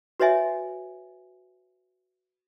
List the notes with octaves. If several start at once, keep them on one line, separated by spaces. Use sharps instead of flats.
F#4 B4 C#5 D#5 E5 G#5